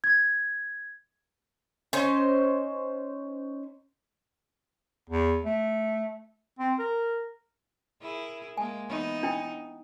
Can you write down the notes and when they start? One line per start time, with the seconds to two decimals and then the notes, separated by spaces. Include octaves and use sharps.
0.04 G#6
1.93 C#4 D#4 C5
5.09 E2
5.45 A3
6.59 C4
6.79 A#4
8.02 E4 G#4 A#4
8.57 G#3 A#3 G#5
8.89 E3 B3 D#4
9.23 D4 E4 G5